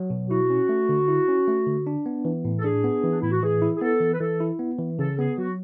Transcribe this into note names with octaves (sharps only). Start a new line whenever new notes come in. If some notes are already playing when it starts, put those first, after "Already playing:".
Already playing: F#3
B2
E4 F#4
C#4
A3
D3
E4
C#4
A3
D3
D4
B3
E3
A2
A4
D4 G#4
B3
E3
D4
A2 E4
F#4
E3 G#4
E4
G#4
B3 A4
E3
B4
E3 A4
E4
B3
E3
C#3 A4
B3 G#4
F#3 F#4